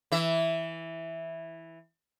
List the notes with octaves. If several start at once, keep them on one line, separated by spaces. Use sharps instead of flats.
E3 E5